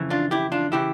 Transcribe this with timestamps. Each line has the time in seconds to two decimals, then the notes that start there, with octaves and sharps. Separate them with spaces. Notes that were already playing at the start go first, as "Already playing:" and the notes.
Already playing: F2 C#3 E3
0.10 D4 F4
0.31 E4 G4
0.52 D4 F4
0.72 C#3 E3 E4 G4